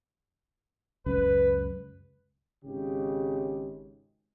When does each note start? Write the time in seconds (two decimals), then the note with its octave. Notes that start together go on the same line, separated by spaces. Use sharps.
1.06 C#2 F#2 C#3 B4
2.64 G#1 C#3 G#3 G4